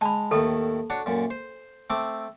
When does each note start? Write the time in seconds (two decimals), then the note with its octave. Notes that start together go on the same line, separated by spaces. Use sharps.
0.01 G#3 A5 B5
0.31 D#2 A2 D#3 A4
0.90 D4 F#4 C#5
1.06 F#2 A#2
1.30 C5
1.90 A3 C4 D6